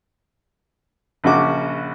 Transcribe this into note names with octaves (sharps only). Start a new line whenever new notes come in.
A#1 C#3 F#4 D6